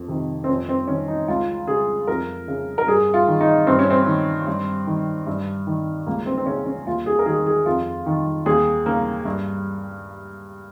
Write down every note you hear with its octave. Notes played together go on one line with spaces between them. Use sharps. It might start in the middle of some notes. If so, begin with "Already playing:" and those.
Already playing: F2
C3 D#3
C4
F2 C#4
C4
D#3 C#4
D#4
C#2 F4
C#3 G#4
F2 A#4
C#3
A#4
G2 G#4
F4
D#3
D#4
G2 C4
C#4
C4
D#3
G2
D#3
G2
D#3
C#2 A#3
C4
C4
C#3 C#4
C#4
D#2 F4
G#4
A#4
D#3 G#4
G#4
F2 F4
D#3
D#2 G#4
C#3 A#3
G2